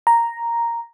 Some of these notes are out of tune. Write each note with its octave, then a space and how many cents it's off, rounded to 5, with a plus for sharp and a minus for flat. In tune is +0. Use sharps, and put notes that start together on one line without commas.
A#5 +0